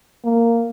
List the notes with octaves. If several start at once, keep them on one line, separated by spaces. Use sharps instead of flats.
A#3